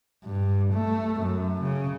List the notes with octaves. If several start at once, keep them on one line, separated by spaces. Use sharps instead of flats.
G2
A3
F#2
C#3